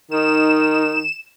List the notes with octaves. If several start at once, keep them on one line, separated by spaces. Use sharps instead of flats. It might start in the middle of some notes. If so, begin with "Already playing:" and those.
D#3 D#4 E7